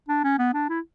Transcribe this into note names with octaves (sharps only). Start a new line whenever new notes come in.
D4
C#4
B3
D4
E4